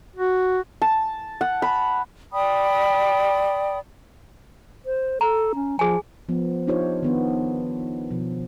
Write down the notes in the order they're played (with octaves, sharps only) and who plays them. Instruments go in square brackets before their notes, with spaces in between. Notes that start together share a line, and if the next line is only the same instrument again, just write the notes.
[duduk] F#4
[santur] A5
F#5
B5
[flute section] D5 G5 B5 D#6
[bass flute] C5
[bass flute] A4 [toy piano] A#5
[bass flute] C#4
[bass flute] F3 [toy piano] G#4 G#5
[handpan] F3 B3
D4 D#4 F4 G4 C5 C#5
D#3 B3 D4
B2 F3